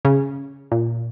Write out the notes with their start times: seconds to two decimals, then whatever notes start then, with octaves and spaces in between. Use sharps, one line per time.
0.05 C#3
0.72 A#2